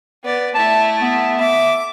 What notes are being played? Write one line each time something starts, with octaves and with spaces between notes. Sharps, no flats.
B3 D5
A3 E4 A5
B3
E5 D6